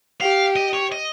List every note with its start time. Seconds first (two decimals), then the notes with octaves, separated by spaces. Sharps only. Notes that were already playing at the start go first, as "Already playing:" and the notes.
0.21 G4 F5
0.56 D#5
0.74 C#5
0.92 D#5